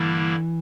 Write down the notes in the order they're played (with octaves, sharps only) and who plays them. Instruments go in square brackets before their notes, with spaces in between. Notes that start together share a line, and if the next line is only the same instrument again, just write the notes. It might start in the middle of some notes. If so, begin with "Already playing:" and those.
Already playing: [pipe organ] G2 D3 G3 A#3 E4 [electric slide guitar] E3